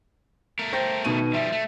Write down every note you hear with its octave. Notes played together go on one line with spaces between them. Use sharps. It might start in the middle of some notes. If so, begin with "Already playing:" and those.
A3 A#4
C5 G5 A#6
B2 D#3 D#7
F3 G3 E5
A3